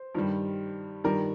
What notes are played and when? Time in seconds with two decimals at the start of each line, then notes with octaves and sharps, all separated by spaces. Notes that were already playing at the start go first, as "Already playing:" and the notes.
Already playing: C5
0.15 G2 D#3 G3
1.04 G2 D#3 G3 A#4 D5